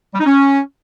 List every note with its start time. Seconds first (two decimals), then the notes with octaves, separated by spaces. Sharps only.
0.14 G3
0.20 D#4
0.26 C#4